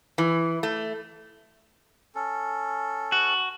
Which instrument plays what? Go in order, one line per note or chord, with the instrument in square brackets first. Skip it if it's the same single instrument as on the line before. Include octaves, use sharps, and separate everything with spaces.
[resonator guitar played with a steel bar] E3
A3
[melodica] C#4 A4
[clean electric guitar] F#4